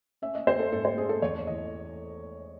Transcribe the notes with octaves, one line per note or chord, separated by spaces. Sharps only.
C#4 E5
D#5
C#4 C5
A4
G#2 A4
C5
C#4 G#4
A4
E2 C#5
E3 D#5